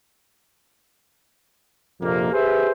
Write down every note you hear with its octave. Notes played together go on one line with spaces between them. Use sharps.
A#1 F2 C3 A#3
G4 G#4 B4 C5 E5